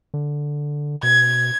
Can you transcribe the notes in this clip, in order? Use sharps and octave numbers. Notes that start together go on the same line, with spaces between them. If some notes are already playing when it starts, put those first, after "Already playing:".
D3
B2 G#6